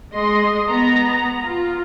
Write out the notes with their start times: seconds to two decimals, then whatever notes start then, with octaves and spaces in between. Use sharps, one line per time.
0.15 G#3 D#5 C6
0.70 B3 A#5
1.44 F4